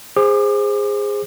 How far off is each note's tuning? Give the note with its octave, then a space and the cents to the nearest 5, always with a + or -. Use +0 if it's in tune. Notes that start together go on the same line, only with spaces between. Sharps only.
G#4 -20 C5 +0 D6 +35